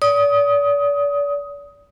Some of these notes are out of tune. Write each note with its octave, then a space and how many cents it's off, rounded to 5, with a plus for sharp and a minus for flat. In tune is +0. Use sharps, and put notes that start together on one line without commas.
D5 -40 D#6 +15